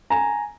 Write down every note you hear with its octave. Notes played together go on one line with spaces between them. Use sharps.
G#5 A#5